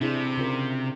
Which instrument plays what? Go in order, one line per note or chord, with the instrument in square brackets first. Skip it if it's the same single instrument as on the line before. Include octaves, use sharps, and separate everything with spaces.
[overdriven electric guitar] C3 [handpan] D4 E4 G#4
[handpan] C#3 F4 A#4